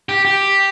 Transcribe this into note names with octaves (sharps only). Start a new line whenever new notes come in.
G4
G4